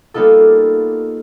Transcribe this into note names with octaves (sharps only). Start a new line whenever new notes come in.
G3 A#3 B3 D#4 F4 A4